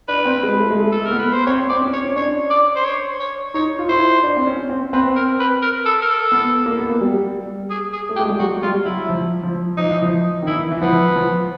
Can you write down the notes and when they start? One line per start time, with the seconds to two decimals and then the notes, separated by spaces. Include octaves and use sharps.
0.08 D4 B4
0.25 C4
0.43 G#3
0.60 A3
0.70 G#3
0.78 A3
0.91 A4
1.05 A#3 A#4
1.11 B3
1.19 B4
1.33 C5
1.47 C4 C#5
1.69 C4 D5
1.81 C#4
1.93 C#5
2.04 C#4
2.16 D4 C#5
2.50 D5
2.76 C5
2.85 C#5
3.20 C#5
3.54 D#4 C#5
3.79 F4
3.89 E4 C5
4.23 D4
4.37 C4
4.47 C#4
4.70 C4
4.93 C4 B4
5.16 A#4
5.40 B4
5.62 A#4
5.85 A4
6.02 A#4
6.08 A4
6.32 B3
6.66 A#3
6.77 B3
6.89 A#3
7.01 G3
7.70 G#4
7.93 G#4
8.09 A3
8.16 G4
8.19 G#3
8.29 G3
8.39 F#3 F#4
8.62 G3 F4
8.85 F#3 E4
9.09 F3
9.43 F3
9.77 F3 D#4
9.90 E3
10.02 F3
10.42 D#3
10.47 E3 E4
10.71 E3
10.81 F3 B3
11.16 F3